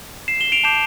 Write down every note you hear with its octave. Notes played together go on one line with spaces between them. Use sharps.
C7 E7
E7 G7
D7 F7
A5 D6 G6 C7 E7